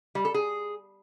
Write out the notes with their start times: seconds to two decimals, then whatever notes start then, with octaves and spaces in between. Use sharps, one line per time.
0.15 G3
0.25 A4
0.34 G#4